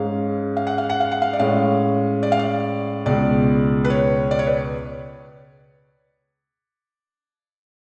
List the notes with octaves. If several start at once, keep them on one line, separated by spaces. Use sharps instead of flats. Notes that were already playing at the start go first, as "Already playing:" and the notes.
Already playing: G#2 G#3 C#4 F5
F5
F#5
F5
F#5
F5
F#5
F5
D5
A2 G#3 C#4 F5
D5
F5
D5
C#2 B2 G#3 D5
B4
C#5
D5
C#5
B4